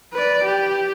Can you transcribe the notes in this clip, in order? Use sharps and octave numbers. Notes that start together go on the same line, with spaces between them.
B4 D5
G4